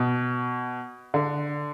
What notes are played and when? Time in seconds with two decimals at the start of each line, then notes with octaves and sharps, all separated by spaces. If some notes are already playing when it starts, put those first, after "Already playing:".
Already playing: B2
1.14 D3